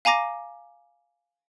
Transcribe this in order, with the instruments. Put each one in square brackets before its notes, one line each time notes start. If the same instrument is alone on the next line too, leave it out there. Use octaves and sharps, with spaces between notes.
[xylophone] F5 G#5 A#5 D6 A#6